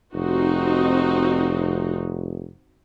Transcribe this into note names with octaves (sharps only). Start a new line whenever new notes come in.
F1 C4 D#4 F#4